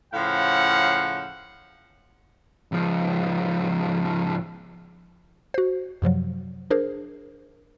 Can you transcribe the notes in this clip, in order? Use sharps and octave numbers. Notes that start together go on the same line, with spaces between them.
A2 C#3 F3 F5 F#5
C#2 F3
F#4 C5
F#2 C3 F3 F#3
D4 G#4 A#4 C5